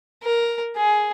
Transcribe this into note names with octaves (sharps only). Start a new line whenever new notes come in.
A#4
G#4